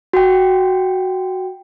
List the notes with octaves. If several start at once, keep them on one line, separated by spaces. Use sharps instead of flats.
F#4 G5